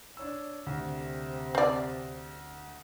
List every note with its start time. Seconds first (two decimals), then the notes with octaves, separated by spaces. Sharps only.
0.17 D4 C#5 E6
0.66 D2 C3
1.55 C4 D5